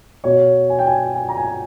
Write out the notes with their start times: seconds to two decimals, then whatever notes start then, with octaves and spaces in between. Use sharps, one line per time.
0.24 B2 C#5
0.70 G#5
0.79 G5
0.87 G#5
1.15 G#5
1.29 A#5
1.37 G#5